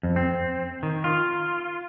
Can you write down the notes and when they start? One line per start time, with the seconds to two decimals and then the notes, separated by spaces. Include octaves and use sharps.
0.03 F2
0.16 C4
0.83 D#3
1.04 F4